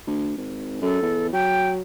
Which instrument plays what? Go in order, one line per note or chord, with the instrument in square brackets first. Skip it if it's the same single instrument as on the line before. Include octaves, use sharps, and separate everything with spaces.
[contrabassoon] D2
G#1
[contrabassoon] F#2 [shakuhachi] A4
[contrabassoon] E2
[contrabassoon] F#3 [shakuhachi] G5